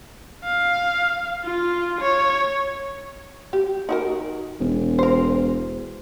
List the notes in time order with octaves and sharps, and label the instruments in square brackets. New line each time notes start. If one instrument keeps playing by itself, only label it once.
[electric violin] F5
F4
C#5
[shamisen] G4
D#4 F#4 A#4
[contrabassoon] E1
[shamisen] A#4 C5